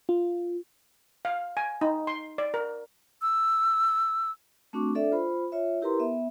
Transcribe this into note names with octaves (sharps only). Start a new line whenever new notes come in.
F4
F5
G#5
D#4
C6
D5
A#4
E6
A3 C4 D4 F#4 C#6 D6
D4 A4 D5 E5
F4 C5 B5
F4 C#5 E5
E4 G4 A#4 B4 A#5 C6
B3 E5